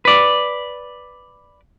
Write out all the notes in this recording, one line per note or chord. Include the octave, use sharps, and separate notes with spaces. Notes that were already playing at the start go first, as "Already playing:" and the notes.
B4 D5